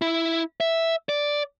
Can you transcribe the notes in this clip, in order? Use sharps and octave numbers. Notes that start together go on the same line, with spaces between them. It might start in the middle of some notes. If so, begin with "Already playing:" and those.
E4
E5
D5